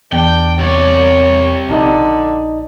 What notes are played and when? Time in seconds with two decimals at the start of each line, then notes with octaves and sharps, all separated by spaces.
0.12 E2 D4 G5
0.60 C3 C#5 D5
1.69 A#1 D3 D#4 D#5